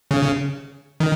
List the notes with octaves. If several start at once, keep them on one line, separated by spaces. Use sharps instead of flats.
C#3
D#3